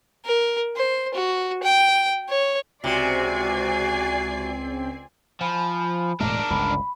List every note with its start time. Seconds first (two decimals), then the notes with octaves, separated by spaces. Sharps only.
0.25 A#4
0.76 C5
1.14 F#4
1.63 G5
2.29 C#5
2.84 C#2 C3 C4 F#4 D5 G#5 C7
5.41 F3 G#5 B5
6.20 E1 A2 G#3 D4 A#4
6.50 G1 C#2 D3 B5